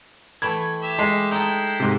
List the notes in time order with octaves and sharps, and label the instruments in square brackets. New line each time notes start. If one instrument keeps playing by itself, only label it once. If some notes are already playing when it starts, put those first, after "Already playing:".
[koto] E3 A3 G5 [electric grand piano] B5 G#6
[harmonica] G4 E5
[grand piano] G#3
[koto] D#4 A4 [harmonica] E4 G5
[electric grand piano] G#2 C3